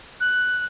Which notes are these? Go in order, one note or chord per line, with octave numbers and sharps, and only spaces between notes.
F#6